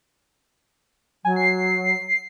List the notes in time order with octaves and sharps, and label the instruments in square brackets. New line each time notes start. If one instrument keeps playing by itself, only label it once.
[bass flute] F#3 [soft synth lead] G#5
[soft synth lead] C7